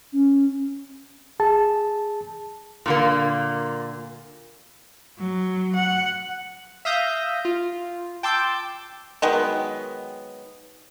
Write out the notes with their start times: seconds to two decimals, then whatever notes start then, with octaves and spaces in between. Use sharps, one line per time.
0.13 C#4
1.40 G#4 A5
2.86 A#2 D3 A#3
5.18 F#3
5.75 F#5
6.85 E5 F5 D#6 G6 A#6
7.45 F4
8.23 G5 A5 C6 D6 E6 G6
9.22 D#3 F#3 G#3 B3